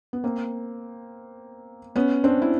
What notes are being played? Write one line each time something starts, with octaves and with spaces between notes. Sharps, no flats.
B3
A#3 C4
B3 C#4
C4 D4
E4